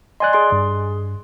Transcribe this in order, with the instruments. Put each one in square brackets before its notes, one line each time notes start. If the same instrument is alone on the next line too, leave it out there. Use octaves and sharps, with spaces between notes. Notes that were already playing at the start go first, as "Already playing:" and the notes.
[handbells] D5 C6 [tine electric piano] D#5 G#5 F#6
[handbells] G#4 C6
[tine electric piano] G2